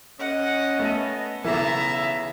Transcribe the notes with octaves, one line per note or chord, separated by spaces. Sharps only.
C#4 D#5 F#5
A3 B3
B1 C#3 E3 E5 A5 A#5